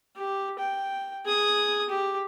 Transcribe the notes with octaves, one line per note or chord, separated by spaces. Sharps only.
G4
G5
G#4 D#6
G4